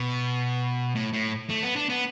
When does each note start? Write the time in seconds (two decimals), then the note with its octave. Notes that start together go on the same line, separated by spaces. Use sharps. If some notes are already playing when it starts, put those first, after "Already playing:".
Already playing: B2
0.95 A2
1.13 A2
1.50 A3
1.62 B3
1.76 D4
1.89 B3